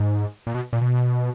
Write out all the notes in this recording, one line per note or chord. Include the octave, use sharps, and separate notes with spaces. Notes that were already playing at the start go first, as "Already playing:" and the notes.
Already playing: G#2
A#2
B2
A#2
B2